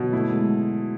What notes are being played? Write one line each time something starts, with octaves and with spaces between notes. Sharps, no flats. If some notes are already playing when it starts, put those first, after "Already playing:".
Already playing: B2 D3 E3 F#3
A3 E4
G#3